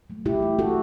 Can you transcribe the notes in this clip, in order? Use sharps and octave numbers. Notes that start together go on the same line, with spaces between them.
F#3 A3
B2 E4 G4
A3
B2 F#4 A4